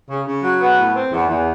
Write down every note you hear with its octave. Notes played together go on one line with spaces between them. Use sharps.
C#3
C#3
F#3
B3
A2
C4
E2
E2